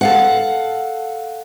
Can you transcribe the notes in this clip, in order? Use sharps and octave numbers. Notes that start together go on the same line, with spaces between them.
A4 F5 F#5